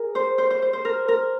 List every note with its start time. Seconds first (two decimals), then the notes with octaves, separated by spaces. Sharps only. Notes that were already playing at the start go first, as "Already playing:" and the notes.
Already playing: G#4 A#4
0.15 C5
0.38 C5
0.50 C5
0.62 C5
0.73 C5
0.85 A#4
1.08 A#4